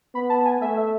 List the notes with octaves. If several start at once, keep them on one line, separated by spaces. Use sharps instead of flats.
B3 B5
A5
G#5
A3 E5
E5